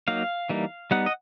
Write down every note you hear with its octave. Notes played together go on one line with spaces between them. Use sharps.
F#3 A#3 D#4 F5
E3 G3 A#3 D#4
G3 B3 D#4 F#5
D#5